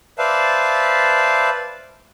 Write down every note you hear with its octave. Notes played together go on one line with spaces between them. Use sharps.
B4 C5 D5 E5 F5 A5